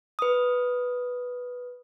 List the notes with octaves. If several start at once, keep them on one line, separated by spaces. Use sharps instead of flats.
B4 D#6